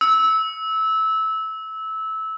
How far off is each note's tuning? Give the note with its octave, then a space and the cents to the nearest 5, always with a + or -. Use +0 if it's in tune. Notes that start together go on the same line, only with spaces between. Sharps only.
E6 -20